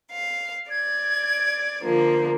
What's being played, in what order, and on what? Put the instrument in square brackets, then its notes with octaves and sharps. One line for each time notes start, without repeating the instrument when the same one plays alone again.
[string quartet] F5
[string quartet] D5 [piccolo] G#6
[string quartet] D3 F3 A#3